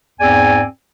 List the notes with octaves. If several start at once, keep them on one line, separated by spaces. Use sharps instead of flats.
E2 G#2 C4 D5 G#5